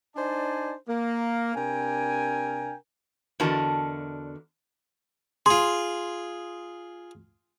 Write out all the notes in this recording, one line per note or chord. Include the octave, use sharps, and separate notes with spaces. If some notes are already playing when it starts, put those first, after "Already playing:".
D4 D#4 C5 D5 G#5 A5
A#3
C3 D4 A#4 G5 G#5
E2 D3 F#4 A#4 D#5 A5
F4 G#4 C6